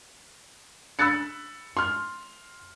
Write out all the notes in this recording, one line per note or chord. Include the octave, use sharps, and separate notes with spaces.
B5 E6 F#6 A6 C#7
C6 F6